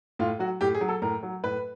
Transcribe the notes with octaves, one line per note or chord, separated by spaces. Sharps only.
A2 F4
F#3 F#4
A2 G4
G#4
F#3
A4
A2 A#4
F#3
A2 B4